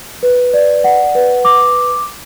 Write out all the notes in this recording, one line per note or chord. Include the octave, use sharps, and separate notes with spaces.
B4
D5
F#5
B4
D6